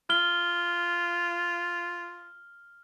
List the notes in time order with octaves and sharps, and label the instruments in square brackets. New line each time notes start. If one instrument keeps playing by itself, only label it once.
[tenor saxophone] F4 [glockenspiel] F6 G7